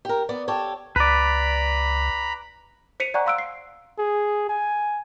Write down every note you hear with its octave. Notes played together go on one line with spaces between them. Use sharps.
G4 A#4
B3 D5
G4 A4 C#5
C#2 B4 D5 A#5 B5
C5 B6 C#7 D#7 F7
D5 F#5 G#5 A#5 C#6 F#6
F5 C6 E6 F#6 D7
C7
G#4
G#5